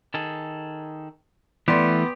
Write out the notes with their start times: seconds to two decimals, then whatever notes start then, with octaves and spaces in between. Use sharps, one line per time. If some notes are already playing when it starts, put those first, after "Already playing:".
0.14 D#3 G#4 A4
1.68 E3 A3 B3 G4 D5 C6